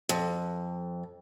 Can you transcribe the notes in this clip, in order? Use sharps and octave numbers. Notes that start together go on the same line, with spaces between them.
F2